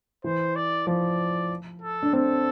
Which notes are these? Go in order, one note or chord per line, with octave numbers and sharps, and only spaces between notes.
E3 C5
D5
F3 D5
A4
D4
C4 A4